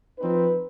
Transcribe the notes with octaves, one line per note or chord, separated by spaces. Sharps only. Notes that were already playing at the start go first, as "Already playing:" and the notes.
F3 C4 D#4 B4